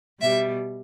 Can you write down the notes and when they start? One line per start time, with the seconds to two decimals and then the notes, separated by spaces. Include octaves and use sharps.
0.21 B2 G3 E5